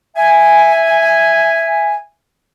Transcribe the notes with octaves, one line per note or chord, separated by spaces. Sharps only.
E5 G#5